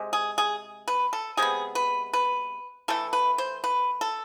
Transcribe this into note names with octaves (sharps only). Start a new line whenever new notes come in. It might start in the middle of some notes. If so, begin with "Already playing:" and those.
Already playing: C3 G#3
G#4
G#4
B4
A4
C3 G#3 B3 G#4
B4
B4
E3 A3 A4
B4
C5
B4
A4